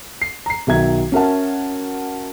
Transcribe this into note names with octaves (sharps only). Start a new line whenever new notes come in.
C7
A#5 C7
B1 D#3 F#3 E5 A#5 G#6
C#4 F#4 A#4 E5 F#5 A5